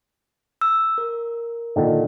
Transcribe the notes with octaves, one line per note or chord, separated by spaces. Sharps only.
E6
A#4
A#2 D3 D#3